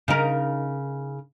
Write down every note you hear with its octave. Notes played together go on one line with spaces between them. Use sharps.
C#3 D#4 A#4